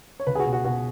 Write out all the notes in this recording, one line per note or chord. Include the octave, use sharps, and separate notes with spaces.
C#5
C#2 B4
G#4
F#4
B2
F#4
B2 F#4